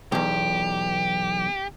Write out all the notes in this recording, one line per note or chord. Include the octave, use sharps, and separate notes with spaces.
B1 E2 G4